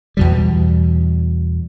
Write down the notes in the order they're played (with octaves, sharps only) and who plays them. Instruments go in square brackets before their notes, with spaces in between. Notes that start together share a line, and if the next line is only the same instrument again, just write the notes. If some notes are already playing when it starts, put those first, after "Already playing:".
[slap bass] E2 B2 G3